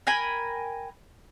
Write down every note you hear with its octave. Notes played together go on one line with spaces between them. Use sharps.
A#4 G5 G#5 B5